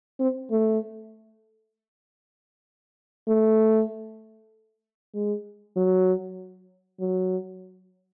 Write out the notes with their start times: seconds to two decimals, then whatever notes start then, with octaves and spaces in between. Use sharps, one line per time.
0.20 C4
0.51 A3
3.28 A3
5.14 G#3
5.76 F#3
7.00 F#3